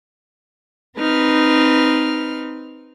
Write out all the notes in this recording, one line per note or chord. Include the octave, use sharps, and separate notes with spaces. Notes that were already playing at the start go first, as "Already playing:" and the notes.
C4 D#4 B4 F6